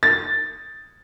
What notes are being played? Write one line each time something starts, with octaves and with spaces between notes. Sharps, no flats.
A6